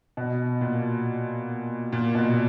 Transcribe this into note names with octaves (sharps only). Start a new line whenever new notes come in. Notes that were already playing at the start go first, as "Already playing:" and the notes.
B2
A#2
A#2
B2